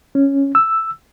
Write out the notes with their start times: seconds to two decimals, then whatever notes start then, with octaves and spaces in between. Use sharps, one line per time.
0.15 C#4
0.55 E6